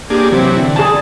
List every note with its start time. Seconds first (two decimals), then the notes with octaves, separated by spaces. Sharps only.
0.10 A#3 D4 G4 G#4
0.32 C3 E3 F#3 C4
0.57 D3
0.76 G#4 D5 A5